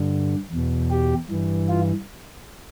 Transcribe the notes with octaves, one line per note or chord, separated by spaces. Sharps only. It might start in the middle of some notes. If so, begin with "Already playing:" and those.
Already playing: G2 D3
E2 B2
G4
G2 E3
F4